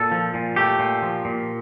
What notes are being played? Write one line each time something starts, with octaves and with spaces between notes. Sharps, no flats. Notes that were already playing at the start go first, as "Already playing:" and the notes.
Already playing: A#2 A4
F3
A#2
A3 G4
A#2
F3
A#2